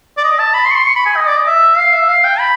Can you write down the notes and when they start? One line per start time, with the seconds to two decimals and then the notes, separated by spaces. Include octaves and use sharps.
0.17 D5
0.24 D#5
0.39 A5
0.54 B5
0.65 C6
0.71 C#6
0.75 C6
0.86 C#6
0.96 B5
1.06 G#5
1.16 D#5
1.28 D5
1.37 D#5
1.47 E5
1.78 F5
1.93 E5
2.09 F5
2.24 G5
2.39 B5